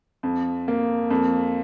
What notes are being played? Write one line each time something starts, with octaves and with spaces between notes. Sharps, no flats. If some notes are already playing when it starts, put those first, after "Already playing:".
F2
A#3
F2